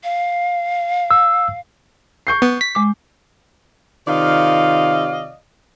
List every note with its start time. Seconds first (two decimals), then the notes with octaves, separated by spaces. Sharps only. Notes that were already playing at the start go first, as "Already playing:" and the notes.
0.03 F5
1.11 E6
2.27 C#6 G6 C7
2.42 B3
2.61 B6
2.75 G#3 D6
4.08 C3 D#3 F4 D5 D#5 F5